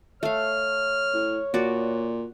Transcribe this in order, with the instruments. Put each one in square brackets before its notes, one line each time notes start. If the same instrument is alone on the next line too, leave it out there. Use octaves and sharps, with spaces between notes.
[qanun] A3 F5 [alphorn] C#5 [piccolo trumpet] F6
[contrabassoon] A2
[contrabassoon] A#2 [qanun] F#4 D5